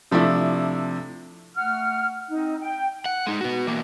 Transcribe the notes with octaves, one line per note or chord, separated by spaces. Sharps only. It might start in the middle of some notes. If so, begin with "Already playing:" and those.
C3 F3 A3 D4 E4
A3 F#5 F6
C4 D#4
G5
F#5
G#3 D#4
B3 F#4
E3 A#3